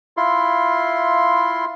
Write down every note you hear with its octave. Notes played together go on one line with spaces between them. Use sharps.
E4 F4 C6